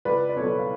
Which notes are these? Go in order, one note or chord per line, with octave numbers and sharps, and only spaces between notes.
C#2 B4 D5
D5
B2 F#3 A4 C#5
F5